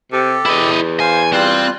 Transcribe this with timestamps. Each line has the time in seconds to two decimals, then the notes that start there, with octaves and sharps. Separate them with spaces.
0.12 C3 G4 A4
0.46 E2 E4 D#5
1.00 C5 F5 G#5
1.33 G3 C4 F4 F#6